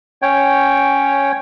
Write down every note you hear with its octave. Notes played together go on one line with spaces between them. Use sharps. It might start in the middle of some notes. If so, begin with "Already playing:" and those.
C#4 C#5 G5